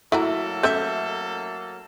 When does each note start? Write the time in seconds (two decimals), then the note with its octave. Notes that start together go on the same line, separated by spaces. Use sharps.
0.12 F#3 A3 A#3 E4 F#4 A4 A#5
0.63 A3 C#4 E5 G6